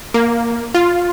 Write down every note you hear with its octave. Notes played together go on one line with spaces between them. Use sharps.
A#3
F4